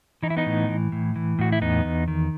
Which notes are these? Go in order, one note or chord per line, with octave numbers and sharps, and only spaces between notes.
E3 D#4
E4
B3 D#4
A2
E3
A2
E3
A2 F#4
E4
E2 B3 D#4
E2
D#3